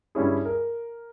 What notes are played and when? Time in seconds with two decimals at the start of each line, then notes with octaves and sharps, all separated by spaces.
0.15 G2 G3 C#4 E4 G#4
0.45 A#4